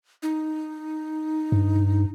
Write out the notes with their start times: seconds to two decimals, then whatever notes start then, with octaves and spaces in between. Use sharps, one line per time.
0.23 D#4
1.52 G2